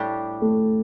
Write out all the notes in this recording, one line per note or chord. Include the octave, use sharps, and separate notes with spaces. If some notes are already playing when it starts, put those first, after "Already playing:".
Already playing: A2 G3 D4 G4
A3